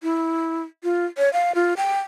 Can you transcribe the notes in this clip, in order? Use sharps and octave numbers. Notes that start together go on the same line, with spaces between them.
E4
F4
C#5
F5
F4
G5